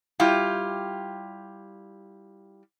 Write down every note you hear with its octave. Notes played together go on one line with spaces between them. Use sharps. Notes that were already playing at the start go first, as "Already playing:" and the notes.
G3 E4 F4 G4